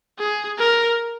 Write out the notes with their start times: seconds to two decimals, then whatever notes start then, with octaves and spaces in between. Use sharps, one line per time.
0.19 G#4
0.58 A#4